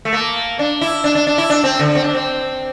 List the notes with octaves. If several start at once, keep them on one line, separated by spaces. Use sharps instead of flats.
A3
A#3
D4
E4
D4
D4
D4
E4
D4
C4
D3
C4
D4
C4